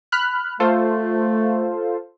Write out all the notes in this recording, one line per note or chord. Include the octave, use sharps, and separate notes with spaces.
B5 F6 F#6
A3 F4 A4 C5